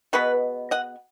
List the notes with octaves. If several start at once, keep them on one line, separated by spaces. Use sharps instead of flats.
B2 G#3 B3 B4
D#5 F#5